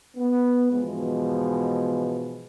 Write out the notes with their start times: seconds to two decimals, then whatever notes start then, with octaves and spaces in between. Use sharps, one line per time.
0.17 B3
0.72 G#2 B2 E3 F3 G#3